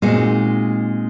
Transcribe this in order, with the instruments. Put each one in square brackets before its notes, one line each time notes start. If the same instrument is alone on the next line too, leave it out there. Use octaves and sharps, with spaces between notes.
[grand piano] A#2 [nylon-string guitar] G#3 C4 D#4 F#4